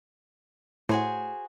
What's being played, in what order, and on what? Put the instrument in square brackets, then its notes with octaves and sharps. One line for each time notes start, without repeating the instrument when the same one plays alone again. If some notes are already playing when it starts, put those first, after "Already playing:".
[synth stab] A2 [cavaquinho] F#4 G#4 C5